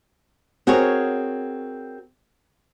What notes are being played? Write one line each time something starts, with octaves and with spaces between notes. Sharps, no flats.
C4 F#4 G#4 A#4 C#5